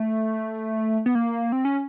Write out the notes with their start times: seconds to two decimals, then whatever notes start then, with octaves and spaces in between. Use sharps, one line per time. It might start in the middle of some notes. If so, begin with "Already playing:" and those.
Already playing: A3
1.06 B3
1.15 A#3
1.52 C4
1.65 C#4